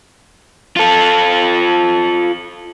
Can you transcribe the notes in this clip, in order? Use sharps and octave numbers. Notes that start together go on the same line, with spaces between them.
F4 A4